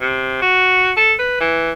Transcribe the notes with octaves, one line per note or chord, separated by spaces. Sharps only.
C3
F#4
A4
B4
E3